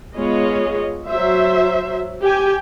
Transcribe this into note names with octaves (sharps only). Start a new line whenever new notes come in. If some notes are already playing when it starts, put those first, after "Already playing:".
G#3 B3 F4 G#4 C#5 D#5
F#3 F#4 C5 E5
G4 G5 G#5